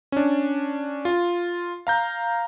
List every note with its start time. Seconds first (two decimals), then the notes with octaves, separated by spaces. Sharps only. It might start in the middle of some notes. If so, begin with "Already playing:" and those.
0.12 C#4 D4
1.05 F4
1.87 F5 A#5 G6